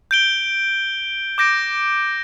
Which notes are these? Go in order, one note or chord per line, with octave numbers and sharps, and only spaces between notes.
G6 D7 G7
D6 G6 A#6 D7